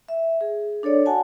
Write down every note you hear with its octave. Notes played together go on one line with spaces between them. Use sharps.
E5
G#4
D4 A4 C#5 D5
F#4 F#5 G#5 A5